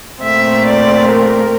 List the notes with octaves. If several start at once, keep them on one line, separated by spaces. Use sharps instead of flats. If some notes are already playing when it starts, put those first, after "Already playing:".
A#2 A3 C4 E5
D5
A#4